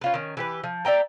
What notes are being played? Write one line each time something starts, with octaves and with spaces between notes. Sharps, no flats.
C#4 F4 B4
D#3 C#4
E3 G4 B4
F3
D5 E5 G5 A#5